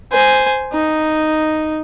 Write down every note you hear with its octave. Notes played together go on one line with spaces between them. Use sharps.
C5 G#5
D#4